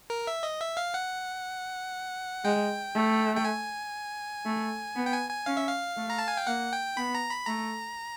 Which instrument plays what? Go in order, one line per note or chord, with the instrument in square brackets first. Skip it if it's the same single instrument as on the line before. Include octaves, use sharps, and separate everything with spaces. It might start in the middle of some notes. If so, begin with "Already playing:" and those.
[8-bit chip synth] A#4
E5
D#5
E5
F5
F#5
[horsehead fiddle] G#3 [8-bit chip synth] G5
[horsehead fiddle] A3
[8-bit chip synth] G5
G#5
[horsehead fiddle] A3
B3
[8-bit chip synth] G5
G#5
G#5
[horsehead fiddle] C#4 [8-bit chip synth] F5
[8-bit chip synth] E5
F5
[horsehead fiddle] A3
[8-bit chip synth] A#5
A5
G#5
G5
[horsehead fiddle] A#3 [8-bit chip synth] F#5
[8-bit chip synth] G5
[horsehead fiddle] B3 [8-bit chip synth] B5
[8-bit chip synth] A#5
B5
[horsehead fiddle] A3 [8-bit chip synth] A#5